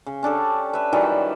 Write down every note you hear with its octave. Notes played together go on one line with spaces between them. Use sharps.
C#3
C#4 D4 G4 A4
B4 E5
D#3 E3 F#3 G3